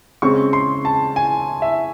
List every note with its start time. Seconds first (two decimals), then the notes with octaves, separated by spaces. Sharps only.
0.22 C#3 G#3 C4 C#6
0.53 C6
0.85 A5
1.16 G#5
1.62 E5